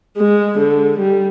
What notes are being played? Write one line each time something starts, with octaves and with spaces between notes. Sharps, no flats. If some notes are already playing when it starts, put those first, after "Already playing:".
G#3
D3
G3